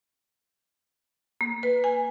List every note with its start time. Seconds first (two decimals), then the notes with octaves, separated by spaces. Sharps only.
1.41 A#3
1.63 B4
1.84 G#5